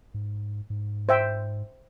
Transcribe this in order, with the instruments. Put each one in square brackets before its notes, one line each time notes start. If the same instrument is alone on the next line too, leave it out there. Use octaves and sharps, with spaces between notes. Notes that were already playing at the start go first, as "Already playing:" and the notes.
[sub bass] G#2
G#2
[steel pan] C5 E5 G5